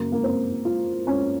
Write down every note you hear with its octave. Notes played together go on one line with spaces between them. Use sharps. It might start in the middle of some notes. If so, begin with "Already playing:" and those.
Already playing: F#2 C#3 A#3
A#3
C4
F4
C#4